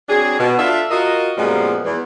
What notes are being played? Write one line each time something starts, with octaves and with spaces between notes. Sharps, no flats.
F#3 C4 D4 G#4
B2
D4 F4 A4 D5 E5
F4 F#4 A#4 D#5
F#2 A#2 F3 G3 G#3 B3
E2